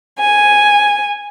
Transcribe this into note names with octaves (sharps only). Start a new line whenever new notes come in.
G#5